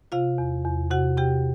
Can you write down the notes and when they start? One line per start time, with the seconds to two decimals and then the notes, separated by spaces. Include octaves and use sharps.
0.12 C3 F4 F5
0.38 E2
0.65 E2
0.91 C3 F#4 F#5
1.17 C3 G4 G5